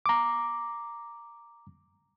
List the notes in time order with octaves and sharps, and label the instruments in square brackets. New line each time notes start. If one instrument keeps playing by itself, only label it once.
[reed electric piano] A#5 D6